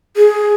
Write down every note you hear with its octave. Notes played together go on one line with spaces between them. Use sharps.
G#4